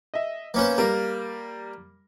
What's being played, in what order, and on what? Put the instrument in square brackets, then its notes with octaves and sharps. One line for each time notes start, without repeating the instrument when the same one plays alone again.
[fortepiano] D#5 E5
[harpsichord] A#3 C#4 C5 [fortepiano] B3 B4
[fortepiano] G3 A#3 [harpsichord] A#4